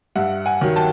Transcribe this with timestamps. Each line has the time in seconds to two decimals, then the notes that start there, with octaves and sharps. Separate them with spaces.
0.16 G2 E5 F#5
0.46 F#5 G#5
0.61 D#3 F#3
0.76 G5 A5